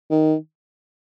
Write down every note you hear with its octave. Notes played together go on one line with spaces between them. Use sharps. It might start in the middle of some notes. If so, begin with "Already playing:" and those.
D#3